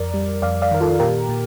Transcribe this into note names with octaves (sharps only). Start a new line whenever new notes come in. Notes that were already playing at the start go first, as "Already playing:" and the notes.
Already playing: F2 A#4 D5
G3
F2 D5 F5
D5 F5
D#3 A#4
F4 A4
A#2 G4 A#4
A#2